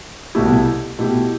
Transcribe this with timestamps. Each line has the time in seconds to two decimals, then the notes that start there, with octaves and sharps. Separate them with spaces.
0.35 C2 B2 A3 E4 G4
0.99 B2 A3 E4 G4